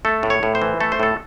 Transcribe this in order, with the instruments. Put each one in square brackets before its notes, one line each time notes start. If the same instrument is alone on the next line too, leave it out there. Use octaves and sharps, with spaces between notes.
[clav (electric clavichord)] A3 A4
A2
C#5
A2
C5
E3
A3 A4
C5
A2 A4